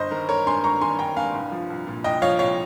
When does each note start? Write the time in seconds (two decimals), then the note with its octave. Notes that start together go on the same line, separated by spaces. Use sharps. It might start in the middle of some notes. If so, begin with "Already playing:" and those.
Already playing: G1 C5 D#5
0.11 D#3 A#4
0.29 G1 A#4 C#5
0.47 G2 G#5 C6
0.64 G1 A#5 C#6
0.81 D#3 G#5 C6
0.99 G1 G5 A#5
1.17 G2 F5 G#5
1.34 C2
1.52 F3
1.70 C2
1.87 A#2
2.04 C2 D#5 G5
2.22 F3 C#5 F5
2.39 C2 C#5 F5